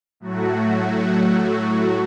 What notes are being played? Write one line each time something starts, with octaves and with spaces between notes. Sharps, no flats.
A2 F#3 A3 F#4